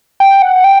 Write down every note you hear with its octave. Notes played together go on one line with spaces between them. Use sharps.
G5
F#5
G5